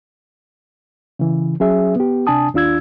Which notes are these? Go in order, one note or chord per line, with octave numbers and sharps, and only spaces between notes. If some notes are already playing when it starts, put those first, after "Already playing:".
C#3 E3
F#3 C#4 G#4 E5
B3 G4
C3 D4 G#5 A5 D#6
D#2 D4 F4 E6 G#6